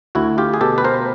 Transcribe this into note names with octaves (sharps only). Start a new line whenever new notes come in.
D2 E4 F#4
F4 G4
G#4
B2 G4 A4
B4
A#4 C5